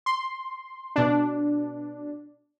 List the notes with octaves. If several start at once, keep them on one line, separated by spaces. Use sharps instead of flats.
C6
B2 D4